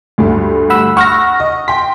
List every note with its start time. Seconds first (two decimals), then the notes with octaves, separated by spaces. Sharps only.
0.18 D2 G2 A3
0.70 F#5 B5 E6
0.97 F#5 C#6 F6 A#6
1.40 D#5
1.68 G5 C6 B6